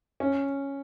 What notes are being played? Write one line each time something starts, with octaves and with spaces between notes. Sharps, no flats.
C#4